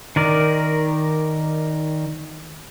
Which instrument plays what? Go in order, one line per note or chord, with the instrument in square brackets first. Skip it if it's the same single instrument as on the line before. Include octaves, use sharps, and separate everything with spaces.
[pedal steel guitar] D#3 A#4 D5